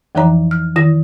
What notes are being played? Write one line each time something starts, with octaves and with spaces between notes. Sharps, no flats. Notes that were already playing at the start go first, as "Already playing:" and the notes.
F2 E3 F3 D#4 C#5 A#5
F6
D#3 E4 A#6